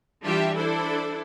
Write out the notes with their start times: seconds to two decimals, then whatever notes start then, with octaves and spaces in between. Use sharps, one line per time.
0.23 E3 G3 D4 F4 G4 E5
0.56 D4 E4 A4 C5